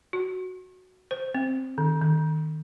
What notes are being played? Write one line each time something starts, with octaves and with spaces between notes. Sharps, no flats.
F#4
C5
C4
D#3
D#3